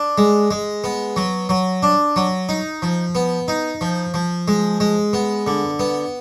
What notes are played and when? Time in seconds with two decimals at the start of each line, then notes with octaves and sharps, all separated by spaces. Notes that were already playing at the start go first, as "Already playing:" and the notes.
Already playing: D4
0.18 G#3
0.51 G#3
0.84 B3
1.16 F#3
1.49 F#3
1.83 D4
2.16 F#3
2.49 D#4
2.82 F3
3.15 B3
3.48 D#4
3.81 F3
4.14 F3
4.48 G#3
4.80 G#3
5.13 B3
5.47 D3
5.79 B3